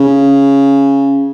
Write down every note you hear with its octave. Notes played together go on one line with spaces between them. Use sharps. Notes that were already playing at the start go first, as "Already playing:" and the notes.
Already playing: C#3